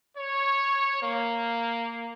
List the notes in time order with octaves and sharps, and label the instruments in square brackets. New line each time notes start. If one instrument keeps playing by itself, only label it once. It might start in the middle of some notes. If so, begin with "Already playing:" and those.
[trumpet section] C#5
A#3